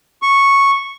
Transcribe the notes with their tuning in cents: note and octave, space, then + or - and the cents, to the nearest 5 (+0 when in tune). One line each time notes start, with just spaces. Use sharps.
C#6 -5